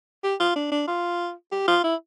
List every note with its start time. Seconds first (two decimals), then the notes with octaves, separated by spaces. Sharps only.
0.24 G4
0.40 F4
0.56 D4
0.72 D4
0.88 F4
1.52 G4
1.68 F4
1.84 E4